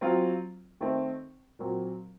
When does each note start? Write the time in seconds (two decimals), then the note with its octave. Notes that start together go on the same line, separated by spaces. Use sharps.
0.01 F#3 C4 F4
0.81 D#3 A3 C4
1.59 A#2 F#3 C4